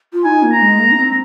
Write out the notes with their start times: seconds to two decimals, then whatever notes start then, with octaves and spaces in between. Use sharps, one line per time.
0.13 F4
0.24 D#4 G#5
0.43 A#3
0.52 A#5
0.61 G#3
0.79 A#3
0.91 D#4
0.97 C4